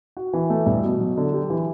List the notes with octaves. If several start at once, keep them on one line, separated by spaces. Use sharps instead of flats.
F#4
E3
A3
G2
B2
F#3
D3
G4
E3